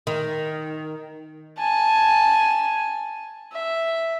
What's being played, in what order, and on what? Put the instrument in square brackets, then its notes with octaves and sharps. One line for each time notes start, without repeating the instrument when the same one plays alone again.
[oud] D#3
[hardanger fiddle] G#5 A5
E5